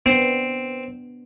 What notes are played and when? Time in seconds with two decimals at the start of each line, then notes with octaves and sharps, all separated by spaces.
0.06 B3 C4 D4